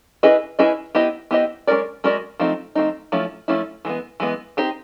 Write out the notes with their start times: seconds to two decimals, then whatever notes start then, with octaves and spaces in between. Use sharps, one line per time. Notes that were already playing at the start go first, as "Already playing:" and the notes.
0.23 C#4 E4 G#4 B4 D#5
0.59 C#4 E4 G#4 B4 D#5
0.95 B3 E4 G4 C5 D#5
1.31 B3 E4 G4 C5 D#5
1.67 G#3 C#4 F#4 A#4 D5
2.04 G#3 C#4 F#4 A#4 D5
2.40 F3 A3 C4 D#4
2.75 F3 A3 C4 D#4
3.12 F3 A3 C#4 E4
3.48 F3 A3 C#4 E4
3.85 E3 G#3 B3
4.20 E3 G#3 B3
4.57 C4 D#4 G4 C5